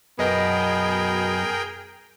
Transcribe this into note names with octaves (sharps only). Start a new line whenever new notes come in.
F#2 B2 B3 G#4 A#4 D#5 G5